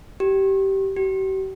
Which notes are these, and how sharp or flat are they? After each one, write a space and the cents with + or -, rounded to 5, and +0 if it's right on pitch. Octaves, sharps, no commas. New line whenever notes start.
G4 -20
G4 -45